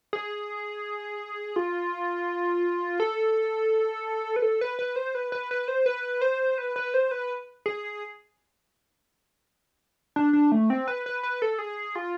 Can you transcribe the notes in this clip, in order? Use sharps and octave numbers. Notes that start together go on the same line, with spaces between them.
G#4
F4
A4
B4
A4
B4
B4
C5
B4
B4
B4
C5
B4
C5
B4
B4
C5
B4
G#4
D4
D4
A3
C4
B4
B4
B4
A4
G#4
F4